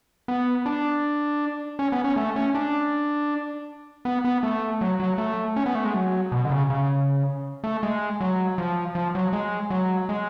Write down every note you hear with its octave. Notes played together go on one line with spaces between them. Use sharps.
B3
D4
C#4
B3
C#4
A3
C#4
D4
B3
B3
A3
F#3
F#3
A3
C#4
B3
A3
G#3
F#3
B2
D3
C#3
C#3
A3
G#3
F#3
F3
F3
F#3
G#3
F#3
G#3